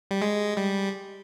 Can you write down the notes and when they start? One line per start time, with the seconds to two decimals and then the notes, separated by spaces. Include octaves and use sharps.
0.11 G3
0.22 G#3
0.57 G3